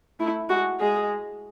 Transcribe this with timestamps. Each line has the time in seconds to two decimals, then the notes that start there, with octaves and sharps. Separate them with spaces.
0.20 A3 E4
0.49 G#3 F#4
0.80 G#3 G#4